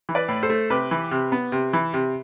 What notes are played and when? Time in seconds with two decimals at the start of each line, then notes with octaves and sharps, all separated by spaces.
0.09 E3
0.15 B4 D5
0.28 A2
0.43 A4 C5
0.50 A3
0.70 C3 G4 B4
0.91 E3
1.11 C3
1.32 B3
1.52 C3
1.73 E3
1.94 C3